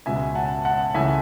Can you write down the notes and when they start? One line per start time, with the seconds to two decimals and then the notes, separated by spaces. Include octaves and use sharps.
0.06 C#2 B2 G#3 E5 G#5
0.35 F#5 A5
0.65 F#5 A5
0.94 C#2 C#3 E3 A3 E5 G#5